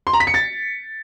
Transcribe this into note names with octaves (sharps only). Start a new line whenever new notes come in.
C6
A#5
B6
C#7
A6